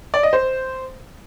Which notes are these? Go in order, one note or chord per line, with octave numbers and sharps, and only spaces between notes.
D5
D#5
C5